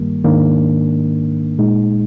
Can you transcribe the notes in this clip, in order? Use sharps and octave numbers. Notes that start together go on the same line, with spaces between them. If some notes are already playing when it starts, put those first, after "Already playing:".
Already playing: G2 D#3 G3 A#3
G#2 D#3 A#3 D4
A#2 G#3 D#4